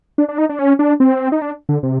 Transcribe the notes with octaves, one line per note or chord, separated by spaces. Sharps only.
D4
D4
D#4
D4
C#4
D4
C4
D#4
D4
D3
C3